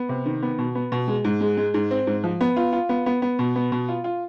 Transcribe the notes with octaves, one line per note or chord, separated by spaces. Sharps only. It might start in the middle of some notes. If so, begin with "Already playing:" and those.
Already playing: B3
C3
D#3
B3
B2
B3
B2
G#3
G#2
G#3
G#3
G#2
C4
G#2
F3
B3
F4
F4
B3
B3
B3
B2
B3
B2
F4
F4